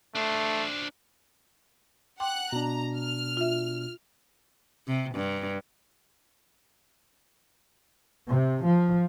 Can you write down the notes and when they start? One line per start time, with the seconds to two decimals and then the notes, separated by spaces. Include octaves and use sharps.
0.15 A3 D4 C5
2.20 F#5 G5 C6 D6 F#6
2.52 B2 D4 A#5
2.96 F6
3.37 F4 E5
4.87 C3
5.15 G2
8.30 C3
8.64 F3